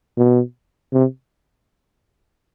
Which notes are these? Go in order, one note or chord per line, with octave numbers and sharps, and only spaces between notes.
B2
C3